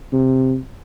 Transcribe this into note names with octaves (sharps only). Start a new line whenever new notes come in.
C3